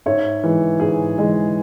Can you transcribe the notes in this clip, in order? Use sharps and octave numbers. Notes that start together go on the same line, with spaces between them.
G#2 C#5 E5
E3 G#3
G#2 G#4
E3 G#3